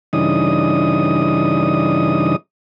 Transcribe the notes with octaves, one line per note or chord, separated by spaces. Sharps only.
G2 C#3 E3 D4 D#4 D#6